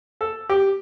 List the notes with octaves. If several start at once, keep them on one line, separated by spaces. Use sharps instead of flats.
A4
G4